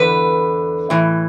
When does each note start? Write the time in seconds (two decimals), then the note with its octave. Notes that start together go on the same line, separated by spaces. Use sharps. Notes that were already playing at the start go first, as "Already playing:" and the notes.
Already playing: E2 D3 B4
0.90 A2 E3